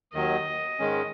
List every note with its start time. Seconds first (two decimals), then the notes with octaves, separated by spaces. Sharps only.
0.14 D#2 D#3 F#3 D#5
0.79 G#2 D#3 G#3 C#4